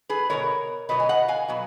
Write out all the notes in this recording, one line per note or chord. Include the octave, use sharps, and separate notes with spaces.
G#4 B4
B2 F#3 B3 A#4 C#5
B2 F#3 B3 B4 D#5
G#5
D#5 F#5
F5 G#5
B2 F#3 B3